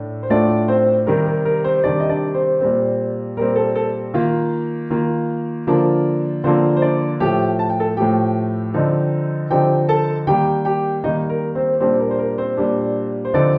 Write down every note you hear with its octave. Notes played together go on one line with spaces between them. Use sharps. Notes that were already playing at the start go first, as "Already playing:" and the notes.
Already playing: A2 A3 D4
C5
A2 A3 D4 F4 D5
C4 C5
C3 D#3 G3 A#4
A#4
A#4
C4 C5
C3 D#3 G3 D4 D5
D#5
D4 D5
C4 C5
A#2 G3 C4
A#2 G3 C4 A#4
A4
A4
D#3 A#3 F4
D#3 A#3 F4
D3 F3 A#3 D4 F4 A#4
D3 F3 A#3 C4 D4 F4 C5
C5
D4 D5
A2 F3 A3 G4 G5
A5
G5
A4 A5
A2 F3 A3 G4 G5
D3 F3 C4 D#4
D3 F3 C4 D#4 G4 G5
A4 A5
D#3 G3 A#3 G4 G5
G4 G5
D#3 G3 A#3 D#4 D#5
A#4
C4 C5
A#2 G3 C4 D4 C5
A#4
C5
A#4
C4 C5
A#2 G3 D4
C5
D3 F3 C4 D4 D#4 D5